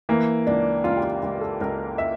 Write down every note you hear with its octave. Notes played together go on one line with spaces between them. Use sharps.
E3 A#3
C#2 D4
C#2 F4
G4
F4
C#2 G4
A4
C#2 A#4
E5